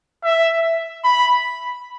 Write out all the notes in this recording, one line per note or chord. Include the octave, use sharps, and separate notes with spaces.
E5
B5